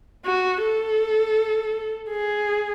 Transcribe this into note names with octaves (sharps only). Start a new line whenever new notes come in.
F#4
A4
G#4